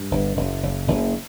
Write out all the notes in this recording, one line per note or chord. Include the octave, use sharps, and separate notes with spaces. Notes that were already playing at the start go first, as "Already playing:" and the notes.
Already playing: G2
G1
F#1
F#1
F#1